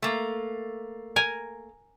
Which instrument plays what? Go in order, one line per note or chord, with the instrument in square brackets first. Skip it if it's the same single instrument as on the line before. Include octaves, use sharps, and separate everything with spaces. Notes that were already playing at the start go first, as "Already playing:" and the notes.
[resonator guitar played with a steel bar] A3 A#3
[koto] A#4 G#5 A#5